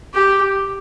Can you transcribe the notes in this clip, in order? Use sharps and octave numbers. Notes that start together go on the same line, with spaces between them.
G4